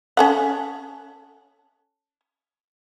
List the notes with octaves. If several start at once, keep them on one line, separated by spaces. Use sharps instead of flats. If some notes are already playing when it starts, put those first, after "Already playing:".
C#4 A4 F#5